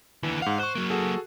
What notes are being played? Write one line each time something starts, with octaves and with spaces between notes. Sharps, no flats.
D#2 D3 E3
G#2 F5 F#5
C5 C#6 F#6
F#3 A#3
F#4 G#4 A4